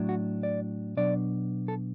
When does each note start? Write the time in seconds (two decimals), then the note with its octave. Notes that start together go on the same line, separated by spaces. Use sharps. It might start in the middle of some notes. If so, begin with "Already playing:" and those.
Already playing: A2 F#3 D4
0.09 F#4
0.43 D5
0.97 B2 F#3 D4 D5
1.68 A4